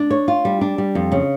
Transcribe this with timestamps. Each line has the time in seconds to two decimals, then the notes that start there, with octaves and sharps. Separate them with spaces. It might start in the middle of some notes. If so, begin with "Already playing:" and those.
Already playing: D4
0.10 C#5
0.28 F4
0.45 G3
0.61 D4
0.78 G3
0.95 F2
1.12 C#3